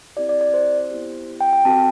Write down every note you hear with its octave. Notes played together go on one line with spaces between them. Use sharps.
C4 E4 G4 D5
D5
D5
C5
B3 E4 G4
G5
G5
C4 F#4 A4 A5